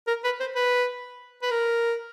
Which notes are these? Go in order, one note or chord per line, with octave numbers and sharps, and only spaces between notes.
A#4
B4
C5
B4
B4
A#4